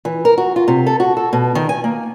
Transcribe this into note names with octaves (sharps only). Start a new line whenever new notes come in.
E3
A#4
F#4
F4
C3
A4
F#4
A4
B2
D#3
G#5
A#3